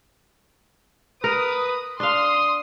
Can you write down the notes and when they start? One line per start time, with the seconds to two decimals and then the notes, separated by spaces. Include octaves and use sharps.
1.24 A#4 B4 D#6
2.00 D4 F5 C6 D#6